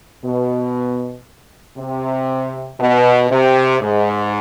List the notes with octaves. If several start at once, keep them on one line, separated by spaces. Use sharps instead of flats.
B2
C3
B2
C3
G#2